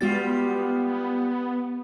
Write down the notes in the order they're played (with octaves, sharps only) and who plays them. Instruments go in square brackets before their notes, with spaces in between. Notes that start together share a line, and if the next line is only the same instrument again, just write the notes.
[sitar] G3 F4 [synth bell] G#3 F#4 A6 [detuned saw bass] B3